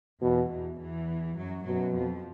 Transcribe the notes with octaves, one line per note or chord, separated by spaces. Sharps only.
E2 B2 E3
E2 E3
E2 E3
F#2 F#3
F#2 B2 F#3
F2 F3